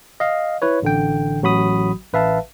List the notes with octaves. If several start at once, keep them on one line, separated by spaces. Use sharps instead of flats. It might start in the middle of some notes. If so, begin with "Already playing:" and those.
D#5 F5
E4 B4 C#5
A1 D3 G5
A1 F#3 F#4 B5 D#6
A1 B4 E5 F5 A5